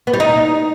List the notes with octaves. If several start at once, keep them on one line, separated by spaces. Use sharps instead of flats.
B3
G3
D#4